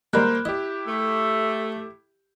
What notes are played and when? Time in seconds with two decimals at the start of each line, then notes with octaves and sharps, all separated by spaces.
0.13 D#3 G3 G#3 A#3 A#4 C5 B5 F#6
0.45 E4 G4 D#5
0.87 A3